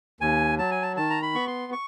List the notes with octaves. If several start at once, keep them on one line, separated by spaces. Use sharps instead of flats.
D#2 G#5
F#3 A5
G#5
A5
D#3 A5
A#5
B5
B3 C#6
C6
C#6